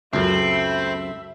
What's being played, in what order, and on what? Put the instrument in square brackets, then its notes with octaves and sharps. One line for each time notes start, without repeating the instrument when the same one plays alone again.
[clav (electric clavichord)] C#2 F#2 [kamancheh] A3 B5 [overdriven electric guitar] C4 [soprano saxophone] E5